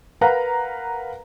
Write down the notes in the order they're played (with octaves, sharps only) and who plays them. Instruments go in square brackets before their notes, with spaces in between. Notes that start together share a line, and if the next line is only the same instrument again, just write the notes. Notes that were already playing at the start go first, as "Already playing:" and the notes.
[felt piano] A#4 B4 F5 F#5 A#5